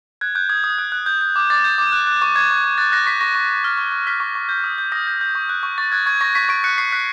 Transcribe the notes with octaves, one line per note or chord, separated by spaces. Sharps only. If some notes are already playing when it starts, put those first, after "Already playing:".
F#6 G#6
F#6 G6
D#6 G#6
D#6
F#6
F#6
G6
G6
D6
D6 A6
G6
D6
F#6
F#6
C#6
C#6 G#6
C#6
C#6
F#6 A6
F#6 A#6
C#6 B6
C#6 A#6
C#6
C#6
F6
C#6
C#6
F6 B6
C#6
C#6
G6
D#6
G6
D#6 A#6
G6
G6
C#6
F#6
C#6
C#6 A6
F#6 G#6
C#6 G#6
C#6 A#6
C#6 B6
C#6 D7
F#6 C#7
C#6 C7
F#6 B6